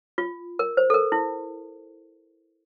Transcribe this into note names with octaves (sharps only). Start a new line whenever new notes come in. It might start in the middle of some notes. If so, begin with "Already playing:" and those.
F4
A#4
C5
A4
A#4
E4